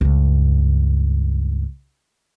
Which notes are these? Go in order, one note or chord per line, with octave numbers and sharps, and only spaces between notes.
C#2 G2